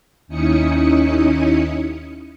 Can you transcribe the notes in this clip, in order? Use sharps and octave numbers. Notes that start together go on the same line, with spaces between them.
D#2 C#4 D#4 E4 D#6 C#7